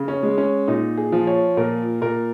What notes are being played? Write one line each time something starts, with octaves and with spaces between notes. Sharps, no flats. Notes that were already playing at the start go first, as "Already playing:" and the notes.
Already playing: C#3
C#4
G#3
C#4
A#2 D#4
G#4
F3
C#5
A#2 A#4
A#2 A#4